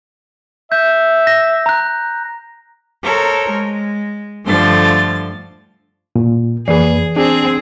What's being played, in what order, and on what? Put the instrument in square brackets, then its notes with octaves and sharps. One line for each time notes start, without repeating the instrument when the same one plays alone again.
[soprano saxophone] E5 [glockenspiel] G6
[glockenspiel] A#6
A#5 F#6
[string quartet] A4 A#4 C5 C#5 A#5
G#3
G2 D3 F3 A3 C6 A6
[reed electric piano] A#2
[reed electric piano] F2 A#3 B4 [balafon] E3 [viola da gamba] G#4
[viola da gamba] C4 G#4 [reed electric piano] D4